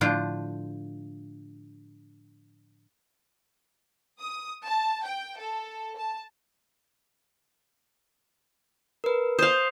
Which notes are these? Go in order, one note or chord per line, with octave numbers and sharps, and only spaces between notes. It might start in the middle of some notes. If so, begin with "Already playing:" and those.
A2 D3 F3 D4 F4 C5
D#6
A5
G5
A4
A5
A#4 B4
C5 F5 D#6 G6